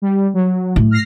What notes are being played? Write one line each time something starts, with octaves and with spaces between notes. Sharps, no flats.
G3
F#3
A2
F6 A#6 C7